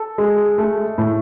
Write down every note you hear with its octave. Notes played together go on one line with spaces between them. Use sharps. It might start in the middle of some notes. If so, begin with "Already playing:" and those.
Already playing: A4
G#3
A3
A2